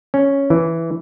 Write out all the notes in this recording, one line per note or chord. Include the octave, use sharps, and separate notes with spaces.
C#4
E3